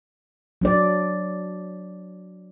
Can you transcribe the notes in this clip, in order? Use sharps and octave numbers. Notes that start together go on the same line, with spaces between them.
F#3 D4 D5